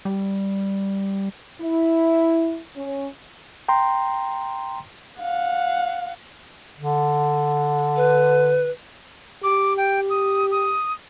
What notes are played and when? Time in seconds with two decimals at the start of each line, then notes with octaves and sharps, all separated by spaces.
0.05 G3
1.61 E4
2.75 C#4
3.69 G5 A#5 C6
5.22 F5 F#5
6.77 D3
7.96 B4
9.43 G4 D6
9.77 G5
10.10 D#6
10.51 D#6